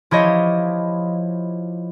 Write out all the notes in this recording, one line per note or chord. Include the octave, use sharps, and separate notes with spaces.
F3 E4 G4 C#5 D#5